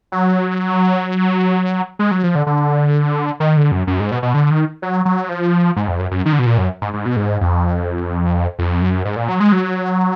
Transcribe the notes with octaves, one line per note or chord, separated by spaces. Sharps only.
F#3
G#3
F#3
F3
D3
D3
D#3
D3
F#2
F#2
G#2
B2
B2
D3
D#3
F#3
F#3
F3
G#2
F2
F#2
F#2
D#3
D3
B2
A#2
F#2
G#2
G#2
B2
G#2
F2
F2
F#2
G#2
A#2
F#3
G#3
F#3